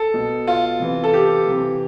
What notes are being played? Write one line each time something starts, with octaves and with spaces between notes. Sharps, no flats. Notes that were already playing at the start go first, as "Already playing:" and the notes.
Already playing: A4
B2
F4
C3 E3
A4
G4
C3 E3